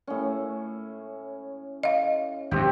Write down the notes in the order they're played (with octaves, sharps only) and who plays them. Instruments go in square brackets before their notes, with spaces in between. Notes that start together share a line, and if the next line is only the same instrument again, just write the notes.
[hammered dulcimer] A2 C#4
[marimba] D#5 F5
[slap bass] G#1 F#2 [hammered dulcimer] C4 G4